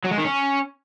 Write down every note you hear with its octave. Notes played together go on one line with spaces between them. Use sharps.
F#3
G#3
D#3
C#4